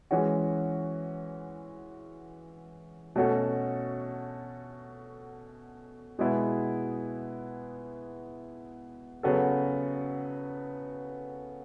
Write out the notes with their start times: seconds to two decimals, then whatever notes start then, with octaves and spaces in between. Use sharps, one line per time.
0.11 E3 G#3 C#4 F#4
3.16 B2 A3 C#4 F#4 A4
6.19 B2 G#3 B3 E4 G#4
9.23 C#3 F#3 B3 F#4 A4